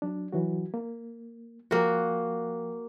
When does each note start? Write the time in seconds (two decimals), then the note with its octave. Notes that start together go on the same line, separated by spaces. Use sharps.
0.02 F#3 D4
0.32 E3 F#3 F#4
0.74 A#3
1.71 F3 A#3 F#4 G5